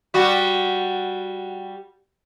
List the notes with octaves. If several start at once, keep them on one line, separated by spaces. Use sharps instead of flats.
G3 F#4